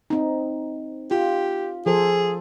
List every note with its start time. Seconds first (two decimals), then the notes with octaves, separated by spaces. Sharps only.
0.10 C4 D#4
1.11 F4 G4
1.86 F3 G#4 A4 C5